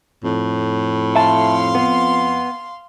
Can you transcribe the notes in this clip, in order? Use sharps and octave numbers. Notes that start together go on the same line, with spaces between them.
F2 A2
E5 F5 A5 C6
B3